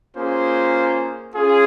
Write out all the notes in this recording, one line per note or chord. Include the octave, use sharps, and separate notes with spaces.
A#3 C#4 F4 G#4 C5
C#4 F4 G#4